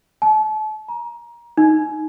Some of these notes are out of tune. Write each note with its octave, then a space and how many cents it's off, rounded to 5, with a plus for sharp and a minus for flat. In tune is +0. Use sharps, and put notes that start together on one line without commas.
A5 -35
A#5 +25
D#4 +5